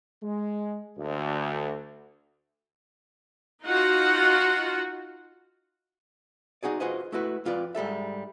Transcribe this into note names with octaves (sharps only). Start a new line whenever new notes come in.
G#3
D2
D#4 F4 F#4 F#5
D#4 F#4 G#4 D5
F4 F#4 G#4 B4 C5 D#5
A3 E4 F#4 B4
F2 F4 B4 D5
G#2 G3 A4 E5